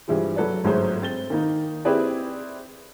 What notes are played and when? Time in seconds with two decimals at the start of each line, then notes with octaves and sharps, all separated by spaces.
0.08 G2 E3 F3 G3 G#3
0.36 F#3 A4 B4 D5
0.64 G1 G#2 F#3 A3 G#4 C5
1.02 C4 A6 G7
1.30 D#3 A#3 D#4
1.85 C4 E4 G4 G#4 B4 D5